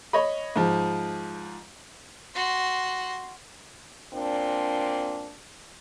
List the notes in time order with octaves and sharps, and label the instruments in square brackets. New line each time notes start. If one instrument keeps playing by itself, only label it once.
[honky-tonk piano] C#5 D#5 B5
G#2 F3
[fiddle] F#4 C6
[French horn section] A#2 C4 D4